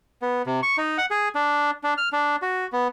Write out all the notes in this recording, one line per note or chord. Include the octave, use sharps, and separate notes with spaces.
B3
C3
C#6
D#4
F#5
G#4
D4
D4
F6
D4
F#4
B3